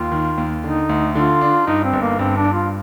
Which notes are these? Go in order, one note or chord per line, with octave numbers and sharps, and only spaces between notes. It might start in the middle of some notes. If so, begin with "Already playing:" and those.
Already playing: D#2 F4
D#3
D#2
D3 D#4
D2
D3 F4
D4
G2 D#4
C4
G1
A#3
G2 C4
D4
G2
F4